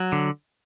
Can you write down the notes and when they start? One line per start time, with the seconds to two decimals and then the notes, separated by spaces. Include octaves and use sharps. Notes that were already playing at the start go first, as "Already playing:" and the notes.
Already playing: F#3
0.12 D3